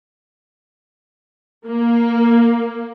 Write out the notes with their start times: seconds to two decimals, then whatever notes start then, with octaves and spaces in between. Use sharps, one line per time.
1.64 A#3